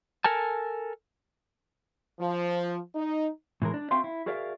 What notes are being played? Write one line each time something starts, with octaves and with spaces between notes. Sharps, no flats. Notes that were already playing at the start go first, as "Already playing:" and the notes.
A4 A#4 G#5 A5
F3
D#4
A2 E3 G#3 A#4
D4
C4 F#4 E5 F5 G5 C6
E4
F#4 G#4 A#4 D5 E5 F5